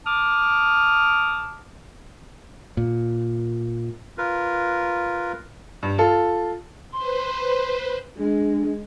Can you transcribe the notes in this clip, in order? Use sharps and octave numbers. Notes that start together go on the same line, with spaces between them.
A5 D6 D#6 F6
A#2
F4 A#4 B4
G2
F4 A4
B4 C5 C6
G#3 D4